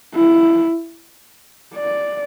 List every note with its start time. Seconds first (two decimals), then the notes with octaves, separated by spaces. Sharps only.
0.15 E4
1.75 D5